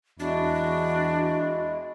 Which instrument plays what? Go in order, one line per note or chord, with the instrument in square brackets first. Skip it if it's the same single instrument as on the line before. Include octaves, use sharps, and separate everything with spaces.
[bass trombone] E2 [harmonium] G#3 E4 [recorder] D4 [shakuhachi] F#4